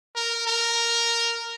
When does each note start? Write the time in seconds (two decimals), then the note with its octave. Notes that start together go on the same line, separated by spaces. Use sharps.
0.15 A#4
0.47 A#4